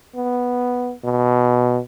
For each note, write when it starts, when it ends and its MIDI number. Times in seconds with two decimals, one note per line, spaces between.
0.16 0.92 59
1.04 1.79 47